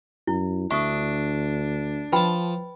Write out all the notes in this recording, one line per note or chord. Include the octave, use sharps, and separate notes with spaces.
F#2 E4
D2 D4 E5 C#6 D#6
F3 B4 G5 A5 B5